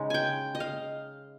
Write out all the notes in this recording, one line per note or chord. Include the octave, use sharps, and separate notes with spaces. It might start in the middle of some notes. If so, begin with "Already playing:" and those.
Already playing: C#3 G#3 D#4
G5 G#5
D#5
F5